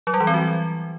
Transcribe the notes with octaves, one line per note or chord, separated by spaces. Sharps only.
F#3
G3
E3
C4
F#4